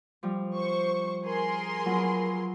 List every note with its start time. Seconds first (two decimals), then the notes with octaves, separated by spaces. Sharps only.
0.23 F3 G3
0.56 C5 C#6
1.25 G#4 A#4 C6
1.85 F#3 B3 F4